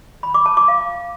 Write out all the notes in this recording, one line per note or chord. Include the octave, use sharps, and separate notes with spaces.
B5
D6
A5
D6
F5